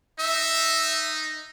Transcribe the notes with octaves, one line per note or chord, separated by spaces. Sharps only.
D#4 E5